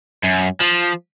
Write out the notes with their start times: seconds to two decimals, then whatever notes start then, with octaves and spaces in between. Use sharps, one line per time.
0.23 F#2
0.60 F3